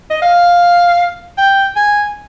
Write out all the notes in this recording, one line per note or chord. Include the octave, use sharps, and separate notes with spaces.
D#5
F5
G5
G#5